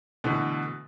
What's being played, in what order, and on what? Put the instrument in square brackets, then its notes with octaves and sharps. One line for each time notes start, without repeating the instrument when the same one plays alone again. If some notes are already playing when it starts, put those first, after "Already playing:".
[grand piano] B2 D3 E3 A3